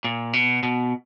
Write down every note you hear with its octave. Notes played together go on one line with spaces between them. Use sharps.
A#2
B2
B2